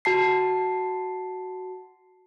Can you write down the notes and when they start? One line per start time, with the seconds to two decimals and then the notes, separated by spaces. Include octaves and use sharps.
0.05 F#4 A5 C7